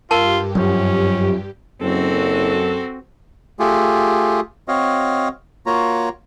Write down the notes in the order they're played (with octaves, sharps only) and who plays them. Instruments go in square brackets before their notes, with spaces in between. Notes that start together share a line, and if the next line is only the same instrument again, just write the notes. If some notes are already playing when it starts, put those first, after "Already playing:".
[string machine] G2 G4 [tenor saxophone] F4 [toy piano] A#4 A5
[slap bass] F#2 F3 [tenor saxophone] C#4
[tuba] F#1 [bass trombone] F#2 [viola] C4 F#4 [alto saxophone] A4
[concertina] A3 F4 G4 G#4
C4 F#4 C#5 D#5 F5
A#3 F4 F#4 C#5 A#5